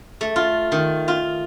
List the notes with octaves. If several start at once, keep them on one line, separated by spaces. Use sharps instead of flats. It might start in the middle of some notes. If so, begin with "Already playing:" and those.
A3
F4
D#3
F4